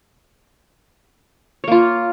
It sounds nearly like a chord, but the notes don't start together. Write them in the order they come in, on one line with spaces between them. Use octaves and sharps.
C#5 A#3 F4